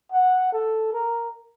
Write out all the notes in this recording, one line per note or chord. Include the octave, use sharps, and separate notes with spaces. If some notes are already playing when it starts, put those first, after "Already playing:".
F#5
A4
A#4